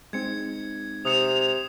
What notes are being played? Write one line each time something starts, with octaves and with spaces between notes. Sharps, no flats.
G#3 C4 D#4 G#6 C#7
C3 D#6 C#7 E7 F7